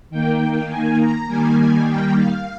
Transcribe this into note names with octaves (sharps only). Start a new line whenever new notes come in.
D#3 A#3 G5
G#5
A#5
D#3 G3 A#3 G#5
G#5
G5
F5